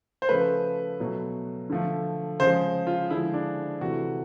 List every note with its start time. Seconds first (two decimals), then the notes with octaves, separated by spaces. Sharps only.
0.22 C5
0.29 C#3 F3 A3 B4
1.00 B2 F#3 A3
1.70 D3 F3 A3
2.40 C#3 F3 G#3 C5
2.87 F4
3.10 D3 F3 G#3 E4
3.33 D4
3.80 C3 E3 A3 F#4